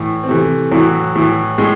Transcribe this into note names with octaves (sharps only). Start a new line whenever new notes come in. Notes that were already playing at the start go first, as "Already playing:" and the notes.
Already playing: A2 E3
C4
C3 E3 A3
A2 E3 F#3
A2 E3
A2 G#3